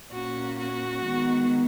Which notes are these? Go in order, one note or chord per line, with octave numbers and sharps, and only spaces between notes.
A#2 A#3 C#4 F#4
F#4
D#3 G#3 B3